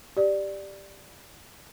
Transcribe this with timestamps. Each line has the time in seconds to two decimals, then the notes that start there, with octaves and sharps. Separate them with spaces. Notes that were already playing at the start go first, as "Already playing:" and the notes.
0.17 G4 D5